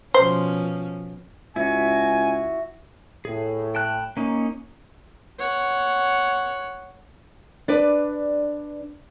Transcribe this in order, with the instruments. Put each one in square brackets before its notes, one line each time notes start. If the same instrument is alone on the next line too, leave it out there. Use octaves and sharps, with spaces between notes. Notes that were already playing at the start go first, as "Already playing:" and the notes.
[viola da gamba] B2 F3 C#4 [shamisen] C5
[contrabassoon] C#2 [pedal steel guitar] E4 F#4 [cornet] G#5
[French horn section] A2 [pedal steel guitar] G#4
[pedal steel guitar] G5 A5 F#6
A#3 C#4 D#4
[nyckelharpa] C#5 F#5
[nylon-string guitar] D4 B4 D5